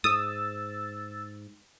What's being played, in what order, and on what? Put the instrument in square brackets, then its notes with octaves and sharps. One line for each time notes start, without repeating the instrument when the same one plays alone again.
[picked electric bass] G#2 [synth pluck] D#6 [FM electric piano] E6 A6